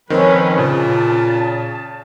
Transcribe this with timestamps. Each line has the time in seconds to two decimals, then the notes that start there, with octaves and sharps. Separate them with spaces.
0.10 D#3 F3 C4 C#4 B4
0.58 A#2 C#3 A5